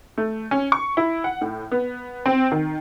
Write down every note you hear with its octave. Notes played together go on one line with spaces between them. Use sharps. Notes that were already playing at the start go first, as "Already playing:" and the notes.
A3
C#4
C#6
E4
F#5
A2
B3
C4
D#3